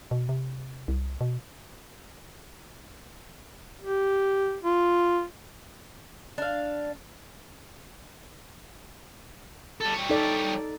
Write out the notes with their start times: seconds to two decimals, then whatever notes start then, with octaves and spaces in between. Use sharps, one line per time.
0.11 B2
0.29 C3
0.88 C2
1.21 B2
3.82 G4
4.63 F4
6.38 D4 F5
9.81 G3 A4
9.94 G3 C#5
10.10 D#4 A4 D5